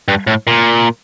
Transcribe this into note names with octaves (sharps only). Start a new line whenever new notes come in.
G2
A2
A#2